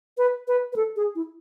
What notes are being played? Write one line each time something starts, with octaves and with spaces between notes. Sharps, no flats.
B4
B4
B4
A4
G#4
E4